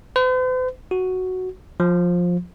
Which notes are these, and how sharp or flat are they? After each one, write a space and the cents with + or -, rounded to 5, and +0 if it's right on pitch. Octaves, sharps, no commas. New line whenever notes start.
C5 -45
F#4 +0
F3 +15